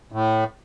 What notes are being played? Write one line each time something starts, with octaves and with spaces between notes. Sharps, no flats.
A2